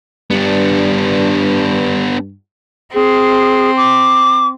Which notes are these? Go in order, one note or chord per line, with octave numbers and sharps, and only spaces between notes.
G2 B3 D4
C4 G#4
D6